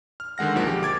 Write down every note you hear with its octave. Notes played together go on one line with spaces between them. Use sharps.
F6
D3 D#3 G#3 F#5 A#6
B1 F3 A#3
G4
D6 G#6 A6